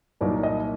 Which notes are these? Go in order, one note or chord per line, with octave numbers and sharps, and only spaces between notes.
C2 A#2 F#3 A#3 D#4 D5
D#5